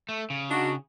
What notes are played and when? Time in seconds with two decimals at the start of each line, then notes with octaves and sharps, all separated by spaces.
0.09 A3
0.30 C#3
0.49 D4 D#4 F#4